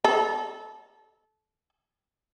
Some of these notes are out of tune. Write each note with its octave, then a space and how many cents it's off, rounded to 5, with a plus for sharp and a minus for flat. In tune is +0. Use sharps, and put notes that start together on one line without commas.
A4 -25